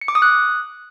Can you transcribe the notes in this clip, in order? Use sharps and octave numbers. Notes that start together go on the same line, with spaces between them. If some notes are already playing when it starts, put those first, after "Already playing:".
C#7
D6
D#6
F#6